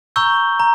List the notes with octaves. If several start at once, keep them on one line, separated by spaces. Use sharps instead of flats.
A#5 C#6 E6 G6 G7
A#5